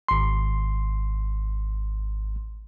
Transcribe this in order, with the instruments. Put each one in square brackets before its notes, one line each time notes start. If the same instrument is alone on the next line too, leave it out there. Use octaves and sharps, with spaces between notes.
[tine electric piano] G#1 C6